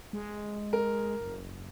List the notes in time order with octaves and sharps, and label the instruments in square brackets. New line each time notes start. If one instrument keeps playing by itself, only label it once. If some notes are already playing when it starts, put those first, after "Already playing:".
[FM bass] G#3
[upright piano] A#4
[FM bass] F#1